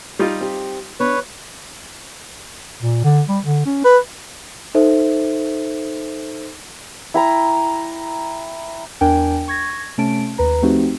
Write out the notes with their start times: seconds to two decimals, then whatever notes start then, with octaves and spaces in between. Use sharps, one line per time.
0.19 G3 D#4 F4
0.41 C4 G4
1.00 B3 D4 B4 C#5
2.83 A#2
3.04 D3
3.29 G3
3.44 D3
3.66 C#4
3.85 B4
4.75 D#4 A4 C5 E5
7.14 E4 G5 A#5
9.01 E2 D4 A#4 G5 G#5
9.48 C#6 G#6 A#6
9.98 C3 A3 C#4 A5 D7
10.38 D#2 B4 A#5
10.62 F3 A3 C4 D#4 F#4 G4